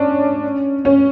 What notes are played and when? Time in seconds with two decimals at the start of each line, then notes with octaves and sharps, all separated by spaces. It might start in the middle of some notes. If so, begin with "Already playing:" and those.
Already playing: C#4 D4
0.85 C#4